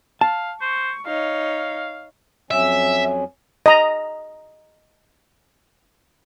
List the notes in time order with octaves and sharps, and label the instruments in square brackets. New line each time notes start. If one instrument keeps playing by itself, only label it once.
[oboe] F5 [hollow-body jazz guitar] A5
[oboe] C5 [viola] C#6
[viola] D#4 C#5 [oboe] F5
[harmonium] F2 F#3 C#4 [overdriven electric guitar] E5
[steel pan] D#5 A#5